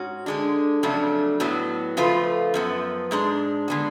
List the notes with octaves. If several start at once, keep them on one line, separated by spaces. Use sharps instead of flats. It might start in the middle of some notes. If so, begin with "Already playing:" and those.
Already playing: G#2 C#4 F#4
D3 G#3 D4
F2 C#3 F#3 A3 D4
A2 F#3 B3 F#4
C#3 F3 A3 F4 B4
F#2 F3 B3
G#2 G#3 D4
D3 G#3 B3 F#4